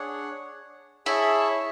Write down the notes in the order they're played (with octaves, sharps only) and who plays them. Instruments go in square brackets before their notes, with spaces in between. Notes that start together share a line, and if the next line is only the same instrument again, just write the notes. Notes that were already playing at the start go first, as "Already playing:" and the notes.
Already playing: [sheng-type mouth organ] D4 G#4 C#5 F#5
[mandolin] E4 [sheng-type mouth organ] G#4 C#5 E5 A5